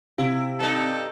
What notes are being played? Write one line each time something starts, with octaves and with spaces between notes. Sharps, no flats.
C3 E4 F5
G2 D#4 A4